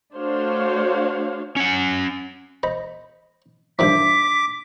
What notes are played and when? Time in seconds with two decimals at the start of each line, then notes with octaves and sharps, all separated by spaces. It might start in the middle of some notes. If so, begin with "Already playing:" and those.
0.16 A3 D4 F#4 C5 C#5 F5
1.56 C#4 F#5
2.63 C5 D#5 B5
3.79 G2 D#3 F3 D4 C5 E5 D6 B6